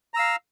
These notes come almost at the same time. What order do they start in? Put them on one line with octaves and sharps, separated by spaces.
A#5 E6 F5